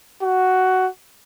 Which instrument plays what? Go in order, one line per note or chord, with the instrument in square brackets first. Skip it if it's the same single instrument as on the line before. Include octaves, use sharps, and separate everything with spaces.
[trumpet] F#4